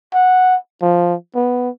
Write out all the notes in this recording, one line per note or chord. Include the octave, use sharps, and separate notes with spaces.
F#5
F3
B3